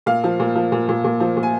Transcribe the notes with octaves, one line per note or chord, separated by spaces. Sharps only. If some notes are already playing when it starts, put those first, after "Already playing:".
A#2 F5
F3
A#2
F3
A#2
A#2
A#2
F3
A#2
G#5